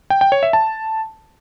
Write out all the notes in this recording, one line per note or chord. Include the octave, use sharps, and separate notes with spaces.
G5
G5
C#5
E5
A5